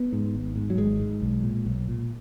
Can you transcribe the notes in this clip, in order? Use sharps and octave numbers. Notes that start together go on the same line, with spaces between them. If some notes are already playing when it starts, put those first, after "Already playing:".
Already playing: B3
G#2
G#1
G#2
F#3
G#1 G#3
G#2
B1
A#2
B1
A#2